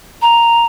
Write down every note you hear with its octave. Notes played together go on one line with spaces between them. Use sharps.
A#5